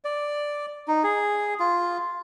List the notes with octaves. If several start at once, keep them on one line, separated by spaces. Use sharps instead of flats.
D5
D#4
G#4
F4